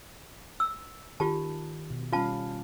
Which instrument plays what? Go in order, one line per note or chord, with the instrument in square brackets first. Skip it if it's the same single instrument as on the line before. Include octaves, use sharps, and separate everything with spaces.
[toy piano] E6
[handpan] D#3 [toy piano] F4 G4 A5
[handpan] B2
[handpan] G3 C#4 F5 [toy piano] F4 A5